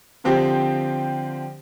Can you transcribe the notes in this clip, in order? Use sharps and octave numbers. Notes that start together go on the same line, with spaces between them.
D3 F3 C4 G4